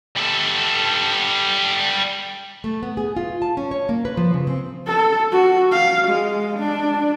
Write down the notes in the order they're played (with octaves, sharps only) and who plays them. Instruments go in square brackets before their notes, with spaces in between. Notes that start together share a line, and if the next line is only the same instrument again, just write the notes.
[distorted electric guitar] G3 A4
[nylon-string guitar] A3
B3
G#4
F4
A5
C#4
C#5
A#3
B4
F3
C#3
C4
[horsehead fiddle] A4
F#4
F5
G#3
D4